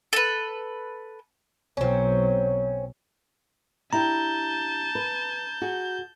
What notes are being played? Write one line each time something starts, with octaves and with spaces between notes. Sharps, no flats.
A4 B4
B1 F#3 C4 C#4
D4 E4 G4 A5 A#5 G6
B4
F#4 G#4